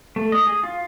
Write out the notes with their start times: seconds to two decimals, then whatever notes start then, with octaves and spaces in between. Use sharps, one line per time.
0.16 A3
0.32 D#5
0.47 G#4
0.64 F4